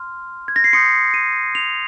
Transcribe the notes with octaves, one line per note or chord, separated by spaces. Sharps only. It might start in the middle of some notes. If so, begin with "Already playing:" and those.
Already playing: C6 F6
G#6
A#6
C7
C6 D#6 G6 C#7
D#7
F7